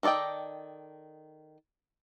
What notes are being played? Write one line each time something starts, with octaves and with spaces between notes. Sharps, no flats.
D#3 A4 D5 D#5 G5